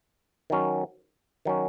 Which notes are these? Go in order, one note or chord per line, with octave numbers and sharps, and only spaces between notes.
D#3 F#3 C#4
D#3 F#3 C#4